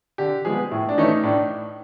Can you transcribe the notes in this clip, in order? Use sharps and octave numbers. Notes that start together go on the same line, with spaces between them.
D3 G4
F3 G#3 B3 G#4
A2 E4
D4
E3 A3 C#4 D#4
A2 D4